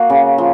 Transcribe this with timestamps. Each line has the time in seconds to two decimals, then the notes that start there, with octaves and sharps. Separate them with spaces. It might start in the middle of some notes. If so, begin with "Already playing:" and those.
Already playing: A#3 F#4
0.10 C#3
0.38 F3